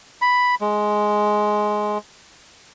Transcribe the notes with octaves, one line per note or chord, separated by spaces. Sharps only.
B5
G#3